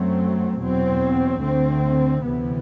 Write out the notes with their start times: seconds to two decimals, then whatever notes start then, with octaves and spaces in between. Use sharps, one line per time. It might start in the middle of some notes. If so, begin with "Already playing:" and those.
Already playing: F#2 F#3 A3 C4
0.60 E2 B2 F#3 C4
1.42 D2 D3 A3 C4
2.23 D2 C3 E3 B3